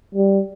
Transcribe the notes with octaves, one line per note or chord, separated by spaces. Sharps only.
G3